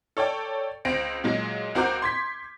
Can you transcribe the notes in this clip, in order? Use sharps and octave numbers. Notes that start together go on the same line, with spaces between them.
A4 C#5 D5 G5
C#2 C4 A#6 D7
A#2 F#3 G#3
C#2 C4 F#4 A#4 D6 G6
C6 G#6 B6